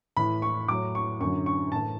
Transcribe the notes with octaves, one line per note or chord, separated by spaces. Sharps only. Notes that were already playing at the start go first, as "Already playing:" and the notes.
A2 E3 B5
C#6
A2 F#3 D6
C#6
F#2 D3 F#3 C#6
C#6
A2 E3 A5